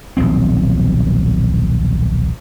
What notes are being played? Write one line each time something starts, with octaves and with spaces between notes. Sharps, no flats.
D#1 B1 F3 C4